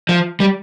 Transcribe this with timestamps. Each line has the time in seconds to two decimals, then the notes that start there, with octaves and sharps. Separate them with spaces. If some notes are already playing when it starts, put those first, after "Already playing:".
0.09 F3
0.40 G3